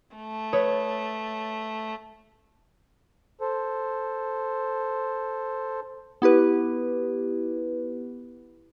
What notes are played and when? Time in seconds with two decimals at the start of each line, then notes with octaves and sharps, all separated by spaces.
0.16 A3
0.53 B4 C#5 D#6
3.41 A4 C5
6.22 B3 E4 G4 B4